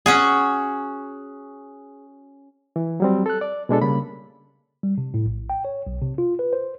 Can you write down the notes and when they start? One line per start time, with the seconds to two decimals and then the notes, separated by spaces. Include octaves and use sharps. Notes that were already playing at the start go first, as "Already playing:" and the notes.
0.06 C#4 F#4 G#4
2.76 E3
3.00 F#3 G3 C4
3.26 A4 F#6
3.41 D5
3.69 B2 G#3 D4 A4
3.81 C#3 G3 A#3 B5
4.83 G3
4.98 C3
5.14 A2
5.26 A#1
5.50 G5
5.65 C#5
5.87 B1
6.01 C3
6.18 F4
6.39 B4
6.53 C5